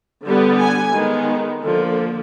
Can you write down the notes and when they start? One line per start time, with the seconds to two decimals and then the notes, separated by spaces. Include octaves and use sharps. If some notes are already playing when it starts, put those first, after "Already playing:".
0.25 D3 G3 B3
0.60 G#5
0.94 D#3 G#3 B3
1.63 D3 F3 A#3